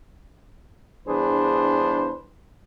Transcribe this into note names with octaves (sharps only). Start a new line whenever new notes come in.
E2 G2 D4 G#4 B4 C5